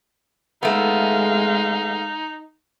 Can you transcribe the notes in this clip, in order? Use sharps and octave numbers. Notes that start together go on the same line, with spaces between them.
G#3 A3 B3 D#4 F5